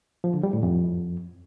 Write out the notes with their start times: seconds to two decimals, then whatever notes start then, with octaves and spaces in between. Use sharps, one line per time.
0.24 F3
0.34 D3
0.43 G3
0.53 A2
0.63 F2